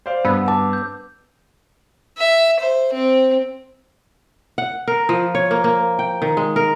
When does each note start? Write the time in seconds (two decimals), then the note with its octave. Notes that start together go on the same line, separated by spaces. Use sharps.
0.06 C5 D5 F5
0.25 G2 B3 B5 E6
0.48 A5 D6
0.73 G6
2.18 E5
2.59 C5
2.94 C4
4.58 F#5
4.88 A#4
5.09 F3
5.35 C#5
5.51 A#3
5.64 A#3
5.99 G5
6.22 D#3
6.37 G#3
6.56 A#4